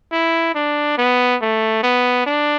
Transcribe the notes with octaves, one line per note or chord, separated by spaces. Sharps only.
E4
D4
B3
A3
B3
D4